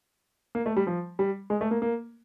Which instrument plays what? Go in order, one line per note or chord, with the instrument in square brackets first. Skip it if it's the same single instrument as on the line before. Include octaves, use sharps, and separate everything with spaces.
[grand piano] A#3
A3
G3
F3
G3
G#3
A3
A#3
A#3